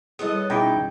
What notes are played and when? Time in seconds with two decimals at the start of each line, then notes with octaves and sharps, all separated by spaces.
0.19 G3 B3 E4 G#4 A4 D#5
0.35 C#5
0.50 B2 C#4 D#4 E4 G#4 G5 D6